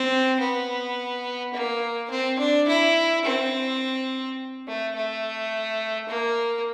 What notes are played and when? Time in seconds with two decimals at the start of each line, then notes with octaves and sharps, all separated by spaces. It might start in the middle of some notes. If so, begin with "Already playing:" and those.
Already playing: C4
0.40 B3
1.54 A#3
2.11 C4
2.39 D4
2.68 E4
3.25 C4
4.67 A3
4.95 A3
6.09 A#3